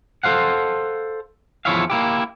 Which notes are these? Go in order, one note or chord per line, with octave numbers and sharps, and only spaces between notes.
A4 A#4 C5 F5 F#5
E2 F3 E4 C#5 E5 F5
A#3 E4 G4